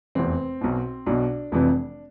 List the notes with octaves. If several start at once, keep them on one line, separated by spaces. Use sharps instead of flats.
F1 E2 C3 E3 C4
B1 B2
B1 B2 D4
F1 F2 C3 E3